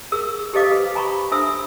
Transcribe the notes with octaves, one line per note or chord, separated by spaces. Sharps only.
G#4 A#4 E6
G4 A4 C5 D#5 F5 D6
B4
G#5 A#5 B5 C#6 D6
D4 A4 C5 E5 E6